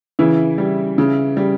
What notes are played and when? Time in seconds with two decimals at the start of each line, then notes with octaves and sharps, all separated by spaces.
0.19 C#3 E3 E4
0.58 G3
0.98 C#3
1.37 G3